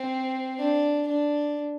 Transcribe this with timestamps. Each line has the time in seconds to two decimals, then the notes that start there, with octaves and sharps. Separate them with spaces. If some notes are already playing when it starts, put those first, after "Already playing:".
Already playing: C4
0.58 D4
1.07 D4